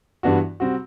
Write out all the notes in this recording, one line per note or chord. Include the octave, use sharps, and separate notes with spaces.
G2 E3 B3 D4 F#4
C3 G3 C4 F#4